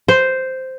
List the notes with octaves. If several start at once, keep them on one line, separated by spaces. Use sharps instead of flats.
C5